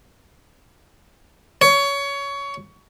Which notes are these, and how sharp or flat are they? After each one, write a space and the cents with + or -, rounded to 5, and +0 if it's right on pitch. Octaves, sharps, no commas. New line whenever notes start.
C#5 +20